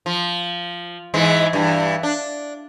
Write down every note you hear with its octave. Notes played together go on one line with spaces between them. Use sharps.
F3
G#2 E3 G#3
G2 E3
D4